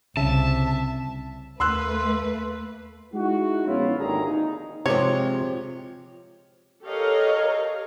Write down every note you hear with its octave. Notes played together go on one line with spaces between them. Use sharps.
C2 C#3 E5 A5
D#2 A3 A#3 B4 C6 E6 F#6
G#3 D#4 E4 F#4
A#1 B3 C#4 E4 F4
G#1 D#2 D3 E4 G#4 A#5
D#4
C3 F3 G#3 C4 G4 C#5
G4 A4 A#4 C#5 D#5 F5